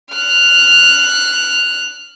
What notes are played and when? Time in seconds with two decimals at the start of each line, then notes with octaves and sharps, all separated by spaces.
0.13 F6 F#6